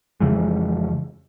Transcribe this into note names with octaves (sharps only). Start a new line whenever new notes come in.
F2 C#3 E3 G#3